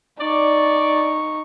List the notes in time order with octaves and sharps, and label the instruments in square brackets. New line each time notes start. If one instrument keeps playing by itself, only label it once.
[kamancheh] D#4 C#6 [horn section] D5